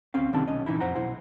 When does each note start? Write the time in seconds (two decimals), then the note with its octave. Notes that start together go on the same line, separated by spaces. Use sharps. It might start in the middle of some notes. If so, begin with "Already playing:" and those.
0.14 D2 C4 C#4 F5
0.33 C2 D3 D#3 G3 C4 A5
0.48 B1 C#4 D#5
0.66 A#2 E3 D#4 E4
0.80 F2 C5 F#5 A#5
0.95 B1 E4 C5 F#5